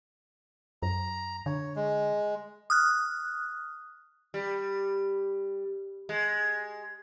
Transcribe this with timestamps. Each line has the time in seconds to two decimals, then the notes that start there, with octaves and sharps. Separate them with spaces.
0.82 F#2 A#5
1.46 D3 C#5
1.75 G#3
2.70 D#6 F6 F#6
4.34 G3
6.09 G#3